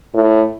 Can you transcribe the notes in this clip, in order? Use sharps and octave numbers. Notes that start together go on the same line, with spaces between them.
A2